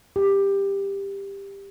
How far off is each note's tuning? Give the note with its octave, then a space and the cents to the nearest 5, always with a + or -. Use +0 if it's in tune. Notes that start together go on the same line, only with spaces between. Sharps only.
G4 +15